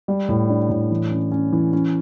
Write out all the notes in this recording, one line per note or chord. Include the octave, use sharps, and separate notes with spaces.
G3
A2
D4
A2
E3
C#4
C#4
E3
C#4